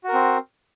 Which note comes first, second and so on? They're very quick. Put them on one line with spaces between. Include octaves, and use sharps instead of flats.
F#4 A#4 C4